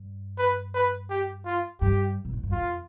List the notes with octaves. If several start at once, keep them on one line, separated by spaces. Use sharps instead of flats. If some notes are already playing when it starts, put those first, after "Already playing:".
Already playing: G2
B4
B4
G4
F4
G2 G4
B2
A2
G2
F2 F4